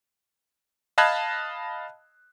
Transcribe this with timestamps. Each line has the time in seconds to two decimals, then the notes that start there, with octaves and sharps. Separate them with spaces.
0.98 D#5 F5 A5 B5 F#6 G#6